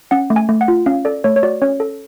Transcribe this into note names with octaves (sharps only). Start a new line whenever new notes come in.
C#4 F#5
A3
G#5
A3
F#5
F4
C#4 F5
A4 D5
A3 C#5
C#5
F#4 D5
C#4 C#5
A4